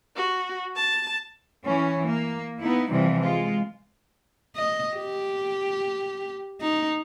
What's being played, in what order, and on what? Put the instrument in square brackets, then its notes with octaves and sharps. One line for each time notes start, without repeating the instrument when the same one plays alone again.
[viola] F#4
A5
[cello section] E3 C#4
A#3
B3 D#4 E4
C3 E3 F3 G3
G#3 F4
[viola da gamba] D#5
G4
D#4